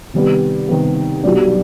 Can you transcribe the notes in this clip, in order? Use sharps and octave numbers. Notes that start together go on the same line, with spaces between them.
C3 D#3 G3 B3
C3 D#3 G3 B3
B1 B2 G3 D4